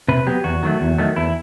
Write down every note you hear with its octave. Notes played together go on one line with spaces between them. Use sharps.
C3 B4
F#3 B3 G4
E2 F#4
D#3 F#3 A3
E2
D#3 F#3 A3
E2 E4